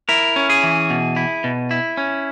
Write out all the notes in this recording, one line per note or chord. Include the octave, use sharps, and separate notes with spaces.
E4 A#4
C#4
G#4
E3
B2
E4
B2
E4
C#4